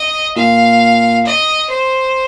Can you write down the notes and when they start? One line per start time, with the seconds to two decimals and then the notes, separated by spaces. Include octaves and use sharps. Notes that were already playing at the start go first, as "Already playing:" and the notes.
Already playing: D#5
0.36 A#2 F5
1.25 D#5
1.70 C5